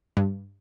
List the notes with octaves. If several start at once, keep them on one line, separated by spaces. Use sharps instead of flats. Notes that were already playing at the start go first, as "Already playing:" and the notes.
G2